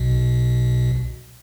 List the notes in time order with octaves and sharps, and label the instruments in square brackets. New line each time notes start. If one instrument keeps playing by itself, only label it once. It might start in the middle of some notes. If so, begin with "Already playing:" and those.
Already playing: [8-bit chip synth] B1 B2